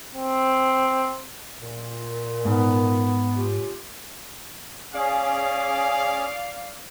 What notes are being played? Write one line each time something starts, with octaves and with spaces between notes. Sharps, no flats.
C4
A#2
G#2 B3
C#4 F4 G4
C#4 G#4 D5 F5